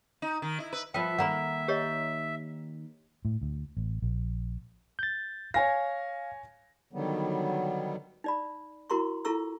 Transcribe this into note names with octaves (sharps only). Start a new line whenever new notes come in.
D#4
D#3
E4
B4
F3 B3 D#5 E5 G5
D#3 A#3 F#5 A#5 B5
G4 C#5 D#5
A2
D2
A1
A#1
G6 A6
C#5 F5 G#5 A#6
D3 D#3 F#3 G3 B3
D#4 D5 B5
E4 F#4 A#4 A#5 C6 C#6
E4 F4 A4 A#5 C#6 E6